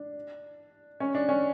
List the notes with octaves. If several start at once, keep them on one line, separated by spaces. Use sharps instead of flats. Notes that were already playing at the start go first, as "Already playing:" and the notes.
Already playing: D4
C#4
D4
C#4